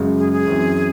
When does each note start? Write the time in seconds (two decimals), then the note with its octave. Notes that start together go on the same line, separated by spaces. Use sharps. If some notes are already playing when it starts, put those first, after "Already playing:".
Already playing: F#2 C#3 G#3
0.18 G#4
0.32 G#4
0.47 F#2 E3 C4